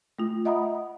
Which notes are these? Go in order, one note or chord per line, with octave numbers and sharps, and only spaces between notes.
A3 F4
D#5 E5 F#5 A#5 B5 D#6